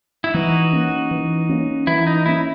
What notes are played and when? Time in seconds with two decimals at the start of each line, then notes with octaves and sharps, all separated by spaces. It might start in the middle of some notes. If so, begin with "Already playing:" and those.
0.24 E4
0.34 E3 D#4 F#4
0.73 A#3 C#4
1.11 E3
1.49 A#3 C#4
1.87 E3 E4
2.07 D#4
2.26 A#3 C#4 E4